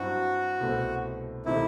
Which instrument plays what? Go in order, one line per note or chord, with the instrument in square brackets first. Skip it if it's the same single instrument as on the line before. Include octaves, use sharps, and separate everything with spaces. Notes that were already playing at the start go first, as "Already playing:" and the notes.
Already playing: [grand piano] G2 F#3 C4 E4 [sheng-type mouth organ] F#4
[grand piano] C2 B2 A3 C4
[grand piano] C3 D#3 A3 D#4 [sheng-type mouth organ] E4